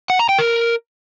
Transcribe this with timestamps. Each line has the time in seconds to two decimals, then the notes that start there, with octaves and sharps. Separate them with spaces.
0.10 F#5
0.19 A#5
0.29 G5
0.39 A#4